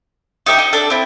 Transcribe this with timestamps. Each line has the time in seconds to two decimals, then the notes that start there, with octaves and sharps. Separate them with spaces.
0.46 D#4 G4 E5 A#5
0.58 D#4 D#5
0.73 D4 A4
0.90 C4 E4